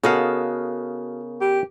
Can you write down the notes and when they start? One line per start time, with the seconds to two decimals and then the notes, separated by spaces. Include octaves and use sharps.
0.04 C#3 B3 F#4 A4 A#4 D#5 F5
1.41 G4